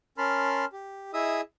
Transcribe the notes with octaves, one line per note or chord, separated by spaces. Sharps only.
C#4 A#4 A5 B5 C6 F6
G4
E4 G#4 D#5 E5 D#6 E6